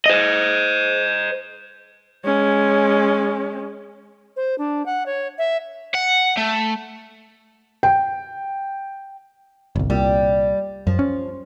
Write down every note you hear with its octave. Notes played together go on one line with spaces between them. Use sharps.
C5 D#5
G#3 C#4
C5
D4
F#5
C#5
E5
F#5
A3
G5
G1 C2
C2 A#2 G3
F#2 F3
C#4